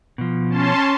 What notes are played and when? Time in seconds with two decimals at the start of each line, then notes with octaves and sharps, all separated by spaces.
0.18 B2 F3
0.50 C#4 A5 C6